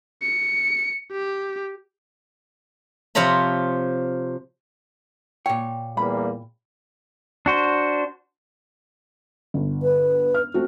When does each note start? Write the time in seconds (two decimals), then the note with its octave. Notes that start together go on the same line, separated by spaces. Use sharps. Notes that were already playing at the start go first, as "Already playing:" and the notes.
0.23 C#7
1.12 G4
3.15 C3 F3 F4 C#5 A#5 B5
5.46 A#2 C#5 G5
5.97 E2 G3 A#3 B5
7.46 D4 F#4 C5
9.54 G1
9.83 B4
10.34 F6
10.54 A3 C4 F#4